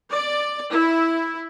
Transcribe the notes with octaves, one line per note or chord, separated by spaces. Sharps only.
D5
E4